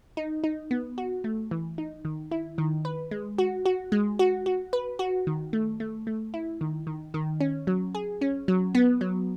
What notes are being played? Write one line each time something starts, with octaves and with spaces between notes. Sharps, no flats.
D#4
D#4
B3
F#4
A3
E3
D#4
D#3
E4
D#3
B4
G#3
F#4
F#4
G#3
F#4
F#4
B4
F#4
D#3
A3
A3
A3
E4
D#3
D#3
D#3
C#4
F#3
G#4
C#4
F#3
B3
F#3